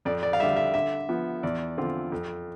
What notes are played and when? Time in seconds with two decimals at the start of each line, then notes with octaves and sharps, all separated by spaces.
0.05 F2 D5
0.23 D5
0.33 F5
0.40 D3 G3 E5
0.57 E5
0.74 D3 E5
1.09 F3 B3
1.43 E2 D5
1.77 D3 F3 C4 F4
2.12 F2